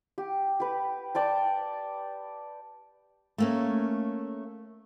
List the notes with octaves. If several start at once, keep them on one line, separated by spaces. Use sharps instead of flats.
G4
G4 B4
D5 G5 A5
A3 A#3 C#4